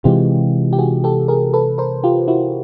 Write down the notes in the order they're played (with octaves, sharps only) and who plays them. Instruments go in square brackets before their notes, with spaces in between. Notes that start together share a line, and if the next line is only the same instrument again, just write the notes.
[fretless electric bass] C3 E3 G#3 [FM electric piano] F4 G4
[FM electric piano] G4
F#4 G#4
G4 A4
G#4 A#4
A4 B4
A#4 C5
F4 G4
E4 F#4